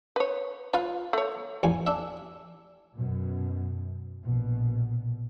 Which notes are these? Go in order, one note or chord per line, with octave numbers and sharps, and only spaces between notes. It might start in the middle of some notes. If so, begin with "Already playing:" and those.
B4 C#5
F4 B4 F5
A3 C#5
A1 F2 G#5
D4 E5
F#2 B2
A#1 B2